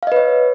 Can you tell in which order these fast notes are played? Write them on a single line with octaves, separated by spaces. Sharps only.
F5 D#5 B4 C#5